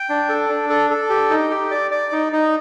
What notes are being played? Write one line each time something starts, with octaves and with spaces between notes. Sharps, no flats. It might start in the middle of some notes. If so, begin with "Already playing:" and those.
Already playing: G5
D4
A4
D4
A4
A4
G4
D#4
G4
D5
D5
D#4
D#4